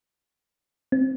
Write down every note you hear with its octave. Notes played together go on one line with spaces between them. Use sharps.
C4